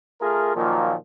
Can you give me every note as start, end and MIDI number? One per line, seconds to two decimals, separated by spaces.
0.20 0.53 57
0.20 0.53 65
0.20 0.53 68
0.20 0.53 70
0.55 0.93 46
0.55 0.93 51
0.55 0.93 53
0.55 0.93 54
0.55 0.93 58